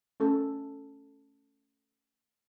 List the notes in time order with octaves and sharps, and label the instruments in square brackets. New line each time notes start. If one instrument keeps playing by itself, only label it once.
[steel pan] A3 C#4 A4